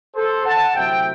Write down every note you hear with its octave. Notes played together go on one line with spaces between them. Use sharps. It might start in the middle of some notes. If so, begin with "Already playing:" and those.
A4 C5
F#5 A5
D2 C3 F#3 C4 E4 E5 G5